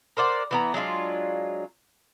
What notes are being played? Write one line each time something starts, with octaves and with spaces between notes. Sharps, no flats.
A#4 C5 D5 F#5
E3 B3 A#5
F#3 G#3 D4 F4